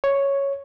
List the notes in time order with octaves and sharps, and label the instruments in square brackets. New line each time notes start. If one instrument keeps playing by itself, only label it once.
[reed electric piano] C#5